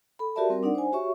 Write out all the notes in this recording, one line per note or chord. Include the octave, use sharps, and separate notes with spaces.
A4 B5
F#4 G4 A#4 D5 E5 A5
G3 C4 A#4
D4 D#4 D5 F#5
C5 G#5
F#4 G4 C#5 E5 C#6